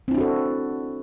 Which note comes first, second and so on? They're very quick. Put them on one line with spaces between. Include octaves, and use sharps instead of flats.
C4 E4 D4 F#4 A4